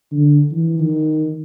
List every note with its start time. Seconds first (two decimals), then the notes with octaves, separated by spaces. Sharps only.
0.12 D3
0.51 E3
0.80 D#3